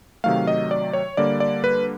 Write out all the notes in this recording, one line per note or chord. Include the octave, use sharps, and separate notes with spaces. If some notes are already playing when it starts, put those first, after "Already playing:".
C3 D#3 F#3 A3 F5
D#5
D5
C#5
D3 G3 A#3 D5
D5
B4